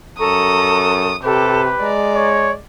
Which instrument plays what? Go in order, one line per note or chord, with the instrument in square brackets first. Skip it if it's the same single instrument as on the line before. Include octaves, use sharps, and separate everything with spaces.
[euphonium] F#2 [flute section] A4 A#5 C#6 [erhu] D#6
[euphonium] C3 [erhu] G4 [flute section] A4 [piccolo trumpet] B4
[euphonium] G#3 [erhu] D5 [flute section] A#5
[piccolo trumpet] C#5